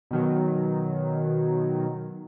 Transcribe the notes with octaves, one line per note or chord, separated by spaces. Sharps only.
B2 D#3 F#3